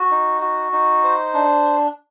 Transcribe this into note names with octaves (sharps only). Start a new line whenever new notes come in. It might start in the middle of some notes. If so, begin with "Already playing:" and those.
Already playing: F#4
D#4
F#4
D#4
C5
D4